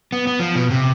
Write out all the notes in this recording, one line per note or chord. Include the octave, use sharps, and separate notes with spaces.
B3
B3
F3
B2
C3